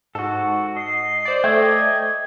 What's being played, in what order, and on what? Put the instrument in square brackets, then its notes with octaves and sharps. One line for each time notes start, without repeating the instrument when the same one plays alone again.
[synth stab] G#2 [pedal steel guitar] F#4 A4
[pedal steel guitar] D#5 [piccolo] C7
[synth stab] C5 D5
[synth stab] A3 [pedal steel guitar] D5 D#5 G5 [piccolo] G#6